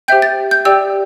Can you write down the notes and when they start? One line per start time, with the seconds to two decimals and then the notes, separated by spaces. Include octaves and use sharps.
0.08 G4 C5 E5 G5 G6
0.22 A6
0.51 G6
0.65 G4 D5 G5 E6